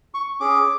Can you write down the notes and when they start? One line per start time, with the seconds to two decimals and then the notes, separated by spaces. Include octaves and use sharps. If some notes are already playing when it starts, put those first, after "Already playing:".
0.14 C#6
0.40 C#4 G#4 D6